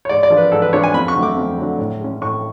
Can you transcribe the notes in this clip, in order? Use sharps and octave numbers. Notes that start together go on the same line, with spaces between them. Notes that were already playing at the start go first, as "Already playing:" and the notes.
C#5
G#2 D5
D5
F3 G#3 D4
B4
G#2 A4
B4
F3 G#3 D4 C#5
G#5
F2 B5
C#6
D3 F#3 A3
D6
F2
D3 F#3 A3
A2
G#3 C#4
A2 C#6